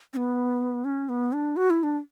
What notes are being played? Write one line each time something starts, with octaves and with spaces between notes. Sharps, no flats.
C#4
B3
C#4
B3
D4
F#4
E4
D4